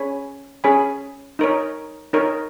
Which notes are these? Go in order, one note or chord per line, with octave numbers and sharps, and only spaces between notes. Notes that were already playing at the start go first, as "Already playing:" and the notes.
Already playing: C#4 G#4 C#5 G#5 B5
C#4 G#4 C#5 G#5 B5
D#4 A#4 C#5
D#4 A#4 C#5